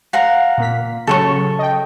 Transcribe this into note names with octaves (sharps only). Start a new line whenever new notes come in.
F5 F#5 A#5
A#2 A#3 B6
C#3 F#3 A4 C#5 C#6
D#5 G5